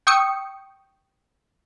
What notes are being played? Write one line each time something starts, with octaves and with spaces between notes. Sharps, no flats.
G5 C#6 D#6 E6 C#7